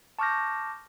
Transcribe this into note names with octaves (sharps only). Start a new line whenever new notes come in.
A5 C#6 D6 F6 G6 A#6